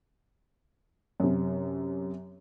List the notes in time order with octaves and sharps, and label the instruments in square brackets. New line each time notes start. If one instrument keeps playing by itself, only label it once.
[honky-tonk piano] F#2 C3